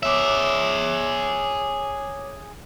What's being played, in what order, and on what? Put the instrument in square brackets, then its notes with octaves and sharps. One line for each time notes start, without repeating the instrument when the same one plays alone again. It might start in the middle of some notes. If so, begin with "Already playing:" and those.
[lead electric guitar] G#4 E5 [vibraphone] C#5 D6